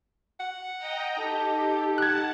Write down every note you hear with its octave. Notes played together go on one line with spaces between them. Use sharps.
F#5
D#5 G5 A#5
D#4 G4 A4
F#5 A5 F#6 G#6